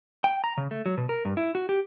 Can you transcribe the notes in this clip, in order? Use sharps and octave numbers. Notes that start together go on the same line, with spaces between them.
G5
A#5
C#3
A3
F#3
B2
A#4
G2
E4
F#4
G4